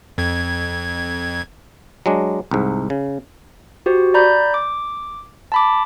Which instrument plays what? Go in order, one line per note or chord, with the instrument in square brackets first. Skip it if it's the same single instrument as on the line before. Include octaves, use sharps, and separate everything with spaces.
[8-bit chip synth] F2 G#6
[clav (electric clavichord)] F#3 G#3 D4
C2 G#2
C#3
[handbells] F#4 G4 C5
D5 A#5 B5 G6
D6
A5 B5 D6